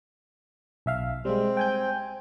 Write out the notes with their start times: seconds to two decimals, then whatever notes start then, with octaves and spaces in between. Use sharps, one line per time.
0.86 B1 E5 F5
1.25 G3 G#3 C4
1.57 G5 G#5 G6